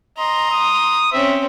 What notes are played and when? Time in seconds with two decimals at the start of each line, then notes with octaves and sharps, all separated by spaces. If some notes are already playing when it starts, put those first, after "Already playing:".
0.18 D#5 A#5 C6
0.51 D#6
1.12 C4 C#4 E5